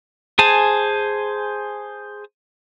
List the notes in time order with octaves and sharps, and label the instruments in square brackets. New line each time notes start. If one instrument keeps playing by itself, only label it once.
[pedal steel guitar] G#4 C5 G#5 A5